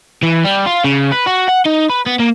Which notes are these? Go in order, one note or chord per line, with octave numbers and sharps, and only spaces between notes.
E3
G3
F4
C#3
B4
F#4
F#5
D#4
B4
B3
A#3